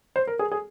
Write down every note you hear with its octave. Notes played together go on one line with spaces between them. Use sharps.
C5
A#4
G#4
G#4